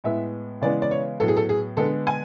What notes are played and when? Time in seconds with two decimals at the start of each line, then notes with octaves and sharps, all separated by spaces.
0.04 A2 G#3 B3 E5
0.62 C#3 E3 G#3 B3 D5
0.82 D5
0.91 C#5
1.20 A2 F#3 B3 A4
1.28 G#4
1.37 A4
1.49 G#4
1.77 D3 G#3 B3 A4
2.07 G#5